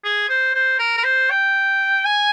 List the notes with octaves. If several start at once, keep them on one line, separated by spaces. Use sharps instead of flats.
G#4
C5
C5
A#4
A#4
C5
G5
G#5